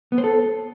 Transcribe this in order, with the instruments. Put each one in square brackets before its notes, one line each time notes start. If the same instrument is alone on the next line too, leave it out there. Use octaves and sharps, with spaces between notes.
[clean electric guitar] B3
C5
A4